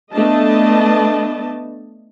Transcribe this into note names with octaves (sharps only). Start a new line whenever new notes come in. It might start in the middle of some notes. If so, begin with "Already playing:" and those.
A3 B3 D4 D#5 A5